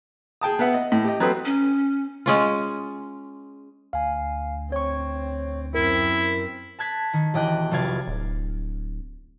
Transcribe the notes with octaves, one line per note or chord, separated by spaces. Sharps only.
G#4 G5 A5 D#6
B3 B4 E5 F#5
D#5
A2
G4 D#5
F#3 C4 A4 B4 D#6
C#4
G#3 C#4 F4
D2 F5 G#5
C4 C#5 C#6
F#2 C4 E4 A#4
A5 F#6 G#6 B6
D#3
E1 G4 D#5 G5 F#6
F1 B1 C3 D5 F5 G#6
D1